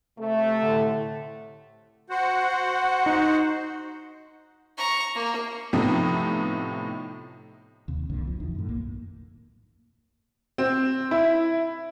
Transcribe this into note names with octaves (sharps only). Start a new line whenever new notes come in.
C3 A3
A2 D3
F#4 C5 F#5
D#4
A#5 C#6
A#3
A2 C3 F3 B3 C4 D#4
D#2 C3
C2 F2 A#2 D3
F3
A#1 E2 D#3
F#2 A2
B1 A#3
C4
E4